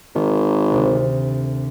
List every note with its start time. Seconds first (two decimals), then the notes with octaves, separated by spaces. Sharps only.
0.15 G#1 D#3
0.70 D2 C3